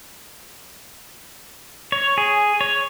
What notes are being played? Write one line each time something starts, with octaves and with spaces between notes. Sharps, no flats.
C#5
G#4
C#5